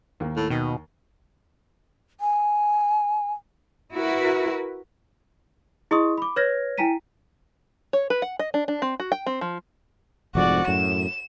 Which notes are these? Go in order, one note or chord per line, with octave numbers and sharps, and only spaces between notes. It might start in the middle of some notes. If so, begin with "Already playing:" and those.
D#2 A#3
A2
B2 D#3
G#5
E4 F#4 A#4 B4
E4 G#4 D#5 C6 C#6 D#6
B5 D6
B4 C#5 F6 G#6 A#6
E4 G5 G#5 A#5 B6 D#7
C#5
B4
F#5
D#5
D4
D4
C4
F#4
G5
C4
F3
F1 F2 G#2 F#4 D5
F#2 A2 E7